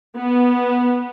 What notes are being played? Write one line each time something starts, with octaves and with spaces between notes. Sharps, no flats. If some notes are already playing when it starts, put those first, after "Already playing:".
B3